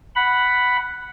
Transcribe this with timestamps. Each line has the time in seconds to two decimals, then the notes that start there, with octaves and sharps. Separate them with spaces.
0.16 F#5 B5